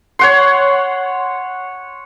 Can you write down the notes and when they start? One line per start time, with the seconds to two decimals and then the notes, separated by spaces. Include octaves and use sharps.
0.19 C#5 F#5 C6